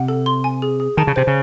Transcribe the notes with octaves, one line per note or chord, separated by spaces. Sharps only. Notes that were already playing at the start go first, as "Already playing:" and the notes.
Already playing: C3 F#5
A4
C6
G#5
G#4
G#4
D#3 A5
C#3
C3 C5
C#3